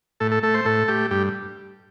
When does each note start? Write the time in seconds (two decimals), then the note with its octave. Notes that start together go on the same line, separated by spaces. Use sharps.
0.20 A2 A4
0.31 A4
0.43 A3 A4
0.54 C5
0.65 A2 A4
0.88 A3 G4
1.11 G2 G4